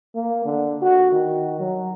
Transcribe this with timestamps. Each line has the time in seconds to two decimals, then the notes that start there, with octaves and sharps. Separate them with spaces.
0.15 A#3
0.45 D3
0.82 F#4
1.12 D#3
1.60 F#3